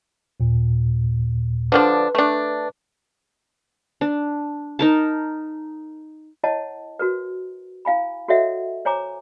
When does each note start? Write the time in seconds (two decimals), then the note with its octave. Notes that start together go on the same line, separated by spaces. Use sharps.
0.40 D#2 A#2
1.72 D3 F3 D4 B4
2.15 A3 D4
4.01 D4
4.79 D#4 A#4 A5
6.43 E4 C#5 D#5 F#5 A5
6.99 F#4 A#4 B4
7.85 E4 F5 G#5 B5
8.28 F#4 A4 C#5 D#5 E5 F#5
8.85 C5 C#5 G#5 A#5 D6